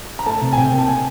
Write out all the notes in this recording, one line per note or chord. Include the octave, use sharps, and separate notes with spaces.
A#5
A3 A5
C3
G#5
C3 G5
A#3
A5
G#5